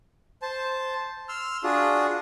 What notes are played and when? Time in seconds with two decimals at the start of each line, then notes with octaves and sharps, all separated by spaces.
0.42 C5 A5
1.29 C6 E6 F6
1.64 D4 F4 F#4 G#4